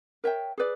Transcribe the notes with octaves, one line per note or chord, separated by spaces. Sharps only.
A#4 C#5 E5 G5
G#4 B4 D5